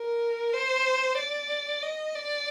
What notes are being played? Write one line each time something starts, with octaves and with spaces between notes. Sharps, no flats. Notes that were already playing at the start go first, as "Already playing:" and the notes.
Already playing: A#4
C5
D5
D#5
D5